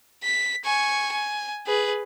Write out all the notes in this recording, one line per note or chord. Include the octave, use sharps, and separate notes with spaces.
B6
G#5 C#6
G#5
G#4 B4